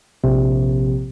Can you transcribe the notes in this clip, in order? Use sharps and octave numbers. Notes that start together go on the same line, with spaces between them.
A#1 C3